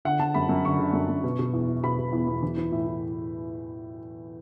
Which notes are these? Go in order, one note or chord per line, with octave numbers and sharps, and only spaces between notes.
D3 F#5
D3 A5
F#2 B5
F#2
D3 C#6
D3
F#2
F#2
B2
B2
E2
E2
B2 B5
B2
E2
E2
E3
E3
A2
A2